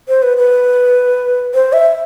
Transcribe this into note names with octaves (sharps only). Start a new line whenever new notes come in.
C5
B4
B4
C5
E5